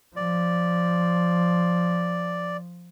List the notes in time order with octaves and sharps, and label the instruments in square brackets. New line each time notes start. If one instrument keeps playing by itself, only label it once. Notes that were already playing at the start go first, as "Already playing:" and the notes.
[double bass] F3 [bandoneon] D5